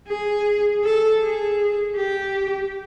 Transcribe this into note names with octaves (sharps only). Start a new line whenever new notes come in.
G#4
A4
G#4
G4